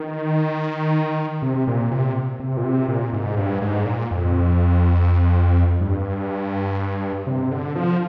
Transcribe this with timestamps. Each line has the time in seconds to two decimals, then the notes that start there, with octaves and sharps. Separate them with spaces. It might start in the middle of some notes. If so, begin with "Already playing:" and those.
Already playing: D#3
1.42 C3
1.67 A#2
1.91 C3
2.40 C3
2.57 A#2
2.64 C3
2.88 A#2
3.13 G#2
3.37 G2
3.62 G#2
3.85 A#2
4.11 F2
5.81 G2
7.27 C3
7.51 D3
7.75 F3